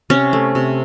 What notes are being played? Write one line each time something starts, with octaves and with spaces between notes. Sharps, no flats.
C3 C#4
A3
C3